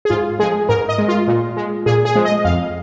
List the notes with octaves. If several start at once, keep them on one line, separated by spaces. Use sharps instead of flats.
G#4
G#2 F4
F3 G#3 G#4
G#2 A#4
D#5
G#3
F4
A#2
G#3
A#2 G#4
G#4
F3 G#3
D#5
F2 F5